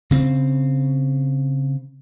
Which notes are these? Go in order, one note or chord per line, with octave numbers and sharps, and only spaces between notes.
C#3 C4